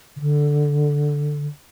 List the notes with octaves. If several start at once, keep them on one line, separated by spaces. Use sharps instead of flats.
C#3
D3